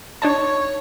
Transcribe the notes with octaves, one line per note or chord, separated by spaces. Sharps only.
D4 D#4 C#5 A5